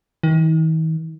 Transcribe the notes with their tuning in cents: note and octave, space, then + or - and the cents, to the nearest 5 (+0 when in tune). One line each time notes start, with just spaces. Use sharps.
D#3 +45